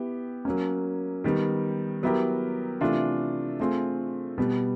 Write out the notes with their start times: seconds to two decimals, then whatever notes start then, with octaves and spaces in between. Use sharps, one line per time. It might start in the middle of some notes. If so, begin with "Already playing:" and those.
Already playing: B3 E4 G4
0.45 F#3 A#3 C#4
1.24 D#3 G3 B3
2.03 F#3 B3 E4 G4 A#4
2.81 C3 E3 A3 D4 F4
3.60 A3 C4 F4 G#4
4.38 B2 G3 B3